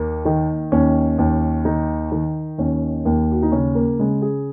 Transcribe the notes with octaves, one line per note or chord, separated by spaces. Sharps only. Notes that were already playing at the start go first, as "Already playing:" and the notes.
Already playing: D#2 A#3
D#3
D#2 C#4
D#2
D#3 D#4
D#3
D#2 C#4
D#2 A#3
F#4
D#4
C#3 C#4
A#3
C#3 G#3
G#4